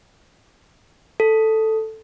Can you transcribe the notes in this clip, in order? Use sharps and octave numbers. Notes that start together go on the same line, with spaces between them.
A4